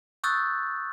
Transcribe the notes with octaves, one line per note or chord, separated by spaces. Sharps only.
C#6 D#6 E6 F#6 G6 A6